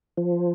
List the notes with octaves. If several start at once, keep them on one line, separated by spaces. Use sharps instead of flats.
F3